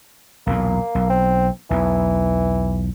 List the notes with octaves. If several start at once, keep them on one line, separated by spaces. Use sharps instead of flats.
B1 E2 A#2 A#3
B1
C4
B1 E2 E3